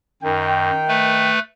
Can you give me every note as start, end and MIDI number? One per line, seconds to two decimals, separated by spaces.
0.23 0.71 42
0.23 1.28 51
0.23 1.28 79
0.88 1.39 57
0.88 1.39 71